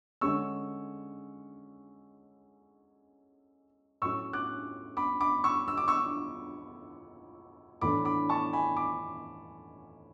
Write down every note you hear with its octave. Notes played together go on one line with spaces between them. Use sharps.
D3 G#3 C#4 C#6 E6
A2 F#3 C#4 C#6 E6
D6 F#6
B5 D6
B5 D6
C#6 E6
E6
D6
C#6 E6
A2 E3 A3 D4 B5 D6
B5 D6
A5 C#6
G#5 B5
B5 D6